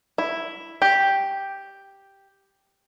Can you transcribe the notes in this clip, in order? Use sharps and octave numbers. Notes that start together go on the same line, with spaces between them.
E4
G4